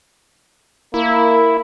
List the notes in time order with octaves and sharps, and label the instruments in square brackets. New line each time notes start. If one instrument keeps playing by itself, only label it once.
[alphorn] A#3 [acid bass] E4